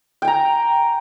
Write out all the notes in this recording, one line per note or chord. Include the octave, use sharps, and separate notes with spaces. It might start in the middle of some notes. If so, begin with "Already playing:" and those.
G5 G#5 A#5